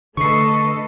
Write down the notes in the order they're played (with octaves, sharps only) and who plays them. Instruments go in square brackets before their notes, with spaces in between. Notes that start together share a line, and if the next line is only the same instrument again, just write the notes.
[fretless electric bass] D3 [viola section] A3 D#5 [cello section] A4 B4 [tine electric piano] C#6 C7